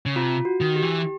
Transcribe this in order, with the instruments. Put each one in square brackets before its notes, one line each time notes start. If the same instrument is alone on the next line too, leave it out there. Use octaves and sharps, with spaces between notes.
[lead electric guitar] C#3
[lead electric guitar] C3 [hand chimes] F4
[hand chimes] F#4
[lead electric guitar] D#3
[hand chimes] G4
[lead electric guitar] E3